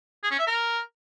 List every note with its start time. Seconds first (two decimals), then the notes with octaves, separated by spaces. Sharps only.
0.23 G#4
0.31 C#4
0.39 E5
0.47 A#4